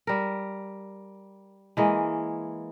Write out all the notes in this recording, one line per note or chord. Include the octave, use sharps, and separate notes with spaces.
G3 A#4
E3 G#3 A#3